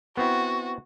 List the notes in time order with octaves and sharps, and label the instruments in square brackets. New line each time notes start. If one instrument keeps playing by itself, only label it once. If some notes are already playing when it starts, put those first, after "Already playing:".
[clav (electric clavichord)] B3 C4 E4 [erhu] F#4